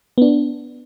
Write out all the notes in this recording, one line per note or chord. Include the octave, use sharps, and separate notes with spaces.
B3
D4